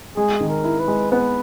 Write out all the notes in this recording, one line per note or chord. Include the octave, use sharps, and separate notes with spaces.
G#3 G#4
D#3
A#4
E4
B4
G#3
B3 B4